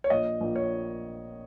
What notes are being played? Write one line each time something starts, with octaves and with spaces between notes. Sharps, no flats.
C#5
A#1 D#5
A#1
C#5